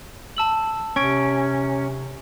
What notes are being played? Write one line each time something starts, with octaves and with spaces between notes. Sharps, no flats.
A5 E6 F#7
C3 C#4 C#6 G#6 D7